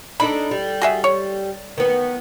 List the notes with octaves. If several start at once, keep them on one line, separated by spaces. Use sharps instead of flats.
D4 D#4 A4 B5
G3
F#4 G#4 E5
C#5
D#3 B3